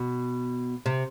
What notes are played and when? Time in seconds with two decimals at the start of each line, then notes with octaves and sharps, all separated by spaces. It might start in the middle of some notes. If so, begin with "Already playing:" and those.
Already playing: B2
0.86 C3